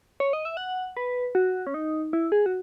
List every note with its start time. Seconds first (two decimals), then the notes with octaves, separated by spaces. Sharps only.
0.20 C#5
0.33 D#5
0.45 E5
0.57 F#5
0.97 B4
1.35 F#4
1.67 C#4
1.74 D#4
2.13 E4
2.32 G#4
2.46 F#4